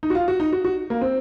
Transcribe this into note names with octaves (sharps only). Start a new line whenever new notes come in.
D#4
F#4
F4
F#4
D#4
F#4
F#4
A#3
C4